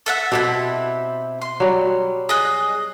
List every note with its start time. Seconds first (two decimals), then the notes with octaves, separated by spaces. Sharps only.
0.06 A4 E5 F#5
0.32 B2 C4 D4 E4 G4 A4
1.42 C6
1.60 F#3 G3
2.29 G#4 D#5 F#6